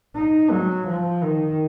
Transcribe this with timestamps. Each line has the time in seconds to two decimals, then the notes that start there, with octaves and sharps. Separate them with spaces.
0.16 D#4
0.51 F#3
0.87 F3
1.24 D#3